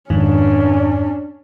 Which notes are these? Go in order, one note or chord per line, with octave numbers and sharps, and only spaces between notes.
F2 G#2 D#3 C#4 D4